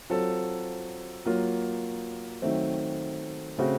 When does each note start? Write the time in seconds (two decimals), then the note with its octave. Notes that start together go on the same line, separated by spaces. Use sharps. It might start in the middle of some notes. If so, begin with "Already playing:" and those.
0.10 F#3 C4 F4 A4
1.25 F#3 A#3 F4
2.42 D#3 F#3 A3 C4
3.58 C#3 A3 C4 F#4